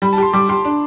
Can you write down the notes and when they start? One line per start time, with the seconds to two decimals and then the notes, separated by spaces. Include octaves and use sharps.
0.02 G3 B5
0.13 A5
0.18 G4 C6
0.33 G3 D6
0.49 G4 C6
0.65 D4